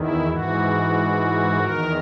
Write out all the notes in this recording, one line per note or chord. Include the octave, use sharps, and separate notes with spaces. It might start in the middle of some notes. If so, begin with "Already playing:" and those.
Already playing: E2 D#3 E4
G#2 E3 F#4
E2 D#3 A#4